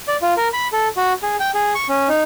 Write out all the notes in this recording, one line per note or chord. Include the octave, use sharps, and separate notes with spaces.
D5
F4
A#4
B5
A4
F#4
G#4
G5
G#4
C#6
C#4
D#4